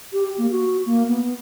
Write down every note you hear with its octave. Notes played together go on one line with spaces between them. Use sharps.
G4
A#3
F#4
A#3
B3